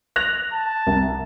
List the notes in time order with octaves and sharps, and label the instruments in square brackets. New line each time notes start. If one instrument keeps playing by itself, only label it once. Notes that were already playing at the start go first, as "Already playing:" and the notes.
[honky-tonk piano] F#6 A#6 F7
[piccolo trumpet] A5
[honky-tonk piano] C2